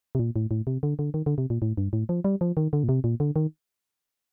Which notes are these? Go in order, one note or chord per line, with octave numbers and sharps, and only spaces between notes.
C3
A#2
A2
A2
C3
D3
D3
D#3
D3
C3
A#2
A2
G2
A2
F3
G3
F3
D#3
D3
A#2
C3
A#2
D3
D#3